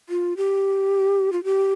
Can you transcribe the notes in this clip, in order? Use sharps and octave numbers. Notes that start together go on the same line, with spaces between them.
F4
G4
F4
G4